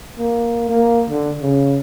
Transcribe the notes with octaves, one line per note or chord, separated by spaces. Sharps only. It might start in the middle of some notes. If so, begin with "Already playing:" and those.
A#3
A#3
D3
C#3